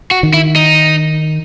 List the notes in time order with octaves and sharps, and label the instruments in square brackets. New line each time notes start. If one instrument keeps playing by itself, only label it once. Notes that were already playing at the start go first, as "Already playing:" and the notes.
[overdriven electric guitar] F#4
[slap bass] D#3
[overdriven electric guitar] E4
D#4